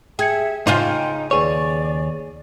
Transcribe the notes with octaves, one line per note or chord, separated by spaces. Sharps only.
G#4 E5 G5 G#6 C#7
C#3 D#4 F4 C5 G5 D6 G6
D#2 G#4 B4 C#5 D5 C#6